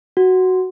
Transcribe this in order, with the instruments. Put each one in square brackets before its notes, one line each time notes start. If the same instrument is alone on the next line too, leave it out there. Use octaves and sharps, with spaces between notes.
[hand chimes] F#4